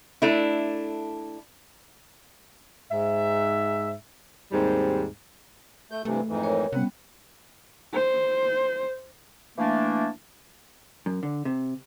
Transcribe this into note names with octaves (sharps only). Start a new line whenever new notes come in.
A3 D4 E4
G#2 E5
D#2 G#2 G3 C4
A3 G6
G2 C3 E3 A3
F2 G#2 E3
A#4 C#5
C3 G3 B3 C#4 F#5
C5
E3 A3 A#3 D4
F#2
D3
C3